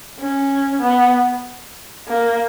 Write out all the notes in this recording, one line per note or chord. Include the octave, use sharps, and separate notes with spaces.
C#4
B3
A#3